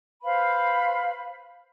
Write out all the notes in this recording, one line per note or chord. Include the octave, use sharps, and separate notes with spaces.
B4 C5 F5 B5